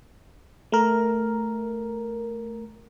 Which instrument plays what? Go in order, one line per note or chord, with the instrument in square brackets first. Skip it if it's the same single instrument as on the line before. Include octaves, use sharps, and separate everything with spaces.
[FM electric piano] A3 A#4